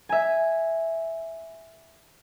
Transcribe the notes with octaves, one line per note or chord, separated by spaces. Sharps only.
E5 G#5